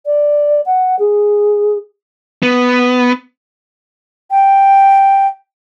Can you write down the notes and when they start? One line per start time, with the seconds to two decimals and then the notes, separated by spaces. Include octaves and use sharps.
0.05 D5
0.65 F#5
0.99 G#4
2.43 B3
4.31 G5